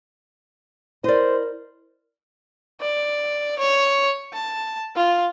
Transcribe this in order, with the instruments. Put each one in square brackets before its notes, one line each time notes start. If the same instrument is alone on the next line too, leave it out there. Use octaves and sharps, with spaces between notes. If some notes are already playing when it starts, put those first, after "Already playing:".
[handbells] E4 A#4 [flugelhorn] C5 [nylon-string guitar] D5 D#5
[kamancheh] D5
C#5
A5
F4